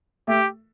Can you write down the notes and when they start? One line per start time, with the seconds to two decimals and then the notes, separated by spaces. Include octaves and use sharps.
0.28 A3 G4